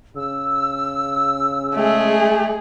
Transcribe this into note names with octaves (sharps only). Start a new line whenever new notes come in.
C#3 E6
G#3 A3 G#4